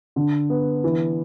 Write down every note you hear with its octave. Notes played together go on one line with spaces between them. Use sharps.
D3
B3
E3